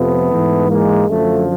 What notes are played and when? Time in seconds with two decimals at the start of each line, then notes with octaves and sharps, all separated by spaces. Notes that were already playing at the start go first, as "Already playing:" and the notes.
Already playing: F2 C3 F3 A3 B3
0.31 G#2 E3
0.69 G#3 A#3
1.07 F#2 D3 F3 A3